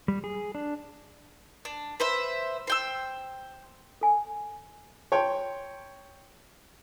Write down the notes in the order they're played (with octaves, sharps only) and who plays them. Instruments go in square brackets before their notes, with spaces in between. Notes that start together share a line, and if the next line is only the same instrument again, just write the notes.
[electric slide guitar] G3
G#4
D4
[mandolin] D4
B4 C5 E5
C5 G5 E6
[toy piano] A4 G#5
[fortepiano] C#5 G5 [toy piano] A5 C6